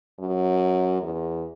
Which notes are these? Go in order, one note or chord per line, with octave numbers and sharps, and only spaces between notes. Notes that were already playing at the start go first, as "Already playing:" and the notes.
F#2
E2